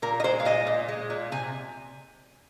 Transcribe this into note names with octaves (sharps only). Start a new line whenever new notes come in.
A#2 A#4
D#5
G#3 C5
F5
A#2 D#5
A#2
G#3
A#2
C3 G#5